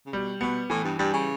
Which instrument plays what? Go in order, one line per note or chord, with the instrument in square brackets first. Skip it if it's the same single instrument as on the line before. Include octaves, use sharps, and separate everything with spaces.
[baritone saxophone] C#3
[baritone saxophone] B2 [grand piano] G3
[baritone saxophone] B2 [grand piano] B3
[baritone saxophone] A2 [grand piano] E3
[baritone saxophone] G2
[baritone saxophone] G2 [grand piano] G3
[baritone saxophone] C#3